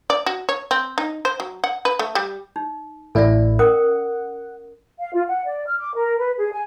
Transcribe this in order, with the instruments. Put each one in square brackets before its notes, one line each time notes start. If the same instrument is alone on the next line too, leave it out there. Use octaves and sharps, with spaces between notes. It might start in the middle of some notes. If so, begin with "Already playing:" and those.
[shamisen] D5
F#4
C#5
C4
D#4
C5
F#3
F#5
B4
A3
G3
[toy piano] D#4
[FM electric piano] A1 A2 E4 [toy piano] A4 D5 E5
[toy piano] C#4 A#4 D#6 [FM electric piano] F#5
[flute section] F5
F4
F#5
D5
F6
D6
A#4
B4
G#4
G#5